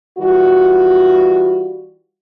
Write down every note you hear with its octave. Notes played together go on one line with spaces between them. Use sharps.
E3 G3 F4 F#4